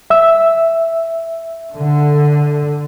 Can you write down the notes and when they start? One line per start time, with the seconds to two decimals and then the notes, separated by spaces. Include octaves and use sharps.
0.10 E5 E6
1.75 D3